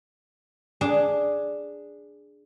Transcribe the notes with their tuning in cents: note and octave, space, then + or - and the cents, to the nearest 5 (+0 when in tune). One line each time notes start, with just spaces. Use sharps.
D4 +0 G#4 +0